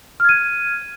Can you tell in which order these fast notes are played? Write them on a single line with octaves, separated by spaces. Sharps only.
F6 G#6 D#7